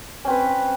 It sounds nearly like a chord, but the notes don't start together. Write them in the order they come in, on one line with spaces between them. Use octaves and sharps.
C#4 C4 B4